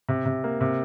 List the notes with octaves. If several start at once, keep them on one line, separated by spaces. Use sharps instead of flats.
C3
C3
A#3
C3